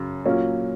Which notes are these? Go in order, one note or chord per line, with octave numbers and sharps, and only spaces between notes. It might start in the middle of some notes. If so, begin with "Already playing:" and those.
Already playing: F#2 C#3
A#2 F#3 A#3 C#4